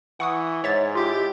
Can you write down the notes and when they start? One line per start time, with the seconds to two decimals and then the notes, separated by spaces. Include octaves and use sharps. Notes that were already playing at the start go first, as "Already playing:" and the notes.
0.20 E3 F#5 C#6 D#6
0.64 G#2 C#5 E5 A6
0.95 E4 F4 G4